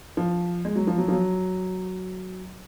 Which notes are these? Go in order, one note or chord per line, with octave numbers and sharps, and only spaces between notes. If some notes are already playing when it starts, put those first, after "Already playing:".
F3
G#3
F#3
F3
F#3
F3
F#3